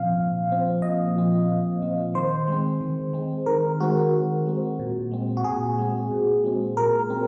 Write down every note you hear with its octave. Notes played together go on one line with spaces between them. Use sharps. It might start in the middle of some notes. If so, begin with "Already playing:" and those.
Already playing: A#2 F3 C4 F5
A#2
F3 C4
A#2 D#5
F3 C4
A#2
F3 C4
D#3 C5
G#3 C4
D#3
G#3 C4
D#3 A#4
G#3 C4 F#4
D#3
G#3 C4
A#2
G#3 C4
F#4
A#2 G#4
G#3 C4
A#2
G#3 C4
A#2 A#4
G#3 C4